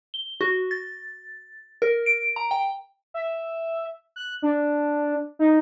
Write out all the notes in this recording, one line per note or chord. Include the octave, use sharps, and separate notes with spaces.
G7
F#4
A6
A#4
D7
A#5
G5
E5
F#6
D4
D#4